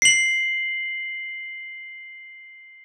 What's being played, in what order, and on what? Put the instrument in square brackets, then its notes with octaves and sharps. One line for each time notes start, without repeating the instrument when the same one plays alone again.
[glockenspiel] C7 F#7